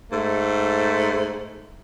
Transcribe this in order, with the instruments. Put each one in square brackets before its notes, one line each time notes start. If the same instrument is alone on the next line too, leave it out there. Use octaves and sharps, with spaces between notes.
[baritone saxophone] G#2 [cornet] A3